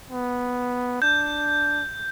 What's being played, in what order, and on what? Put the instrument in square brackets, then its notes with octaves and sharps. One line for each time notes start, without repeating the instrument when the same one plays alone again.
[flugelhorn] B3
[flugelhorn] D4 [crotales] G6